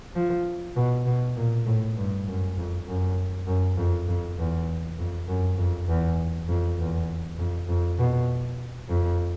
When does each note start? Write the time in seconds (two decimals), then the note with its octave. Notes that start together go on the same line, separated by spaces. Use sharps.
0.15 F3
0.76 B2
1.06 B2
1.36 A#2
1.66 A2
1.97 G2
2.27 F#2
2.57 F2
2.87 F#2
3.47 F#2
3.78 F2
4.08 F2
4.38 E2
4.98 F2
5.28 F#2
5.58 F2
5.88 E2
6.48 F2
6.79 E2
7.38 F2
7.69 F2
7.99 B2
8.90 F2